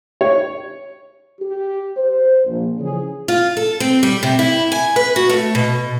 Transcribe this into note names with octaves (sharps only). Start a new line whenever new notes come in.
C#5
G4
C5
A#1
C#3 E3 F3 G#4
F4
A4
C4
G3
C3
E4
G#5
B4
F#4
A3
B2